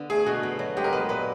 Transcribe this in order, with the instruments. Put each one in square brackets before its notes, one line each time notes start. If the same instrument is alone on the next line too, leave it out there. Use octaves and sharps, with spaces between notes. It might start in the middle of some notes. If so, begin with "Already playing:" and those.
Already playing: [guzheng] D3 B3
[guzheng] A3 [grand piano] G#4
[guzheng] B2 [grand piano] F#4
[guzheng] B2
F#3
[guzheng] G#3 [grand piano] G4
[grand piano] A#4
[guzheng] B3 [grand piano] B4
[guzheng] A#2 [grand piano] B4